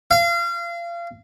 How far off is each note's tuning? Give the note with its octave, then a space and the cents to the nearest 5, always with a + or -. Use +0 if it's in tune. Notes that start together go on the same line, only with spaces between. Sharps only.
F5 -30